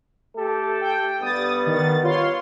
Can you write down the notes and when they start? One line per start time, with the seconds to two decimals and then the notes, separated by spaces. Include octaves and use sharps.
0.36 A3 G4 A4
0.81 G5
1.22 G2 G3 B3 D#6 A6
1.66 D#3 A6
2.03 F4 C#5 C6